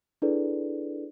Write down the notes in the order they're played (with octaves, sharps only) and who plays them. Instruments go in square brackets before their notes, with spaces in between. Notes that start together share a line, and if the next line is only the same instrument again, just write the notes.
[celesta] D4 E4 G#4 A4 B4 D5